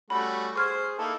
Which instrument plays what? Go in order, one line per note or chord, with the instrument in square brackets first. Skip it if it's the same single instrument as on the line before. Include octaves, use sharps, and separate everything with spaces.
[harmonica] G3 A3 F#4 [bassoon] C#4 [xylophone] B5
[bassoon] G#4 [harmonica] C5 [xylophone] C#6 F6 G#6
[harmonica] A#3 D#4 E4 [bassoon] A4